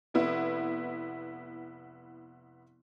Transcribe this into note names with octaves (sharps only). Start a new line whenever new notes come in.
F1 B3 E4